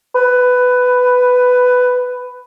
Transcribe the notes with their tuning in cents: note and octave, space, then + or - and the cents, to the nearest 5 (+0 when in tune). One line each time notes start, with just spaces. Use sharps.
B4 +10